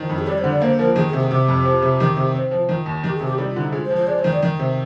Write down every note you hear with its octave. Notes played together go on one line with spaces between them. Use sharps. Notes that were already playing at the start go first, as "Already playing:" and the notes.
Already playing: D#3 F3
F2 D#4
G#4
G3 D5
C5
D3
D5
A#3 C5
F3 A#4
D#3 G#4
G#4
C3
G#4
C3 G4
F2
F3
C3
D#3
C3
C4
F3
D#3 F4
D#2
D#3 G4
G#4
C3
G4
G3 D#4
F4
D3
D#4
G#3 F4
C5
F3
C5
G#3 D5
C5
D#3
D5
D#3
C3